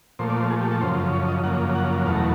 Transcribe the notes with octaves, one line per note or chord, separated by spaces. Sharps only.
A#2 F3 A3 C5
D5
C5
G#4
G4
A4
F#2 C#3 F3 C5
C#5
D#5
F#2 C#3 F3 A#3 F#5
F#5
E2 B2 F#3 A3 F5
A#5